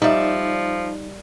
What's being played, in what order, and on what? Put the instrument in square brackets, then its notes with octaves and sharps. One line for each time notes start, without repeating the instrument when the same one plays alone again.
[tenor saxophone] F3 [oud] G3 [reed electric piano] D#4 [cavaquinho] D5 E5